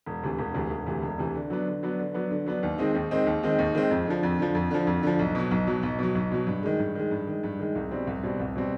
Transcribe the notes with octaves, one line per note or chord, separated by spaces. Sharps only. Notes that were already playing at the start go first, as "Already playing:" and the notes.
E1
D2 C3 E3
E1
D2 C3 E3
E1
D2 C3 E3
E1
D2 C3 E3
D3
F#3 B3 D4
D3
F#3 B3 D4
D3
F#3 B3 D4
D3
F#3 B3 D4
D#2
D#3 G#3 C4 D#4
D#2
D#3 G#3 C4 D#4
D#2
D#3 G#3 C4 D#4
D#2
D#3 G#3 C4 D#4
F2
D3 F3
F2
D3 F3
F2
D3 F3
F2
D3 F3
B1
B2 F#3
B1
B2 F#3
B1
B2 F#3
B1
B2 F#3
G2
D#3 G#3
G2
D#3 G#3
G2
D#3 G#3
G2
D#3 G#3
C2
B2 G3 C4
C2
B2 G3 C4
C2
B2 G3 C4